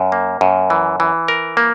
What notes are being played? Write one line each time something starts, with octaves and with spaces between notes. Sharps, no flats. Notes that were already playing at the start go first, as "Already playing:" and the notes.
Already playing: F#2
A#3
F#2
E3
E3
A#4
A#3